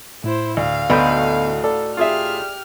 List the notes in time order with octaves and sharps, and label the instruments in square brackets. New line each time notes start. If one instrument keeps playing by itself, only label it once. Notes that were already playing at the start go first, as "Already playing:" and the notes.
[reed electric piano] A2 [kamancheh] E4 C5
[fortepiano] D2 [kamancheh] F5
[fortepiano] D2 [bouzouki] A2 D#4 F#4 [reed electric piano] B3 B5 G6
[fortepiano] A4 [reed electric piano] D5
[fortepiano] F4 G#4 E5 [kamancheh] G4 F6